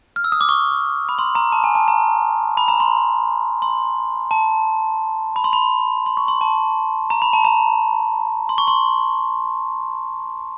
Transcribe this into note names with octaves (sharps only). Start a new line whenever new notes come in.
F6
E6
D#6
D6
C#6
B5
C6
A#5
A5
G#5
A5
A#5
B5
A#5
C6
C6
A5
B5
C6
B5
C6
C#6
C6
A5
A#5
B5
A5
A#5
C6
C#6
C6